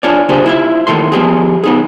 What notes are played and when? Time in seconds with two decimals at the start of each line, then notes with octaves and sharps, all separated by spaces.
0.03 D4 F4 G#4 C#5 D5
0.29 C#3 A#3 D4 G4 G#4 C5
0.46 E4 F4 E5
0.87 D#2 A2 D#3 E3 A3 C6
1.12 F3 B3 G4 G#4
1.64 B3 D#4 G#4